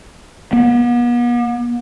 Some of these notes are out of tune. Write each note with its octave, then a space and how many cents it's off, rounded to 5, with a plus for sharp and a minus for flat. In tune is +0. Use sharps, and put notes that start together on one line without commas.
B3 -40